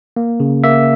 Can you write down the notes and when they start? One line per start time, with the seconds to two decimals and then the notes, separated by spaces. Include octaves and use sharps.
0.16 A#3
0.40 C#3
0.64 A#3 E5